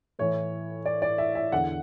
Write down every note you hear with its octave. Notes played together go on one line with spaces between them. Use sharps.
A2 E3 C#5
D5
D5
E5
E5
E2 D3 F#5